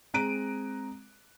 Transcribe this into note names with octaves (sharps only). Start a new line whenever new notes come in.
G#3 C4 A#5 F#6 D7 D#7